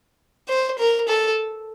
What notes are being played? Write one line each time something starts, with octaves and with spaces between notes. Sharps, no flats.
C5
A#4
A4